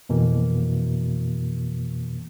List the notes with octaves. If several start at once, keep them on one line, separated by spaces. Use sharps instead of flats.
F2 B2 E3 A#3